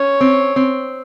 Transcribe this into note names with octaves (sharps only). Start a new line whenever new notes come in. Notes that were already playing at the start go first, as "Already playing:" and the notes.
Already playing: C#4 C#5
C4
C4